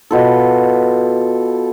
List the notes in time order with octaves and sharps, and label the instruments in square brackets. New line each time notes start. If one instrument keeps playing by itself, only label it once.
[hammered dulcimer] B2 F4 A4